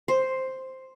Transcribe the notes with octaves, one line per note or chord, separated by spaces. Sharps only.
C5